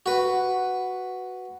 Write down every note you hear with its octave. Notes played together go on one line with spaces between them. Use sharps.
F#4 B4